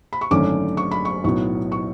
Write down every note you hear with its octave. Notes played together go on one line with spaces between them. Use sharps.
B5
C#6
G#1 F#2 D3 A3 C#4 D6
C#6
B5
C#6
B1 A2 F#3 B3 C#6
C#6